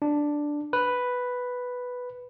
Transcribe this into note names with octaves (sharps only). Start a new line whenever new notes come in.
D4
B4